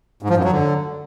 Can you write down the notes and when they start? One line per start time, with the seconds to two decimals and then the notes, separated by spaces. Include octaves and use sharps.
0.22 G#2
0.30 F3
0.37 F#2
0.44 F#3
0.52 D3